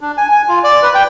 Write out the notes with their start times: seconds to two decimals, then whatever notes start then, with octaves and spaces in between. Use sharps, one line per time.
0.01 D4
0.17 G#5
0.31 G#5
0.49 F4
0.64 D5
0.82 B4
0.95 G5